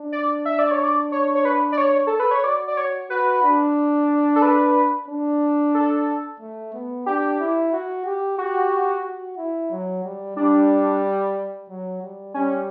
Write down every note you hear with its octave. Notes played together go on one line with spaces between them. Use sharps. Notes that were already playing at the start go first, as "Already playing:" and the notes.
Already playing: D4
D5
E5
D5
C#5
D5
C#5
C#5
B4
D5
C#5
A4
B4
C#5
F#4 D5
D5
C#5
F#4 B4
D4
A4
B4
D4
A4
A3
B3
D4 G4
E4
F#4
G4
F#4 G4
F#4
E4
F#3
G3
G3 D4
F#3
G3
G3 C#4